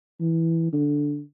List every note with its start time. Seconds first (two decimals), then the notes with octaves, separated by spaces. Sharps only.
0.20 E3
0.72 D3